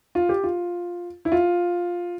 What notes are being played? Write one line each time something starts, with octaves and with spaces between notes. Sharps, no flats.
F4
G4
F4
E4
F4